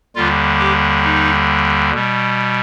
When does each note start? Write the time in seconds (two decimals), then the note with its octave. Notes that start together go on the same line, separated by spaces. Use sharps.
0.15 D#2 D3 G3 F4
0.59 G4
1.04 D#4
1.93 B2 G3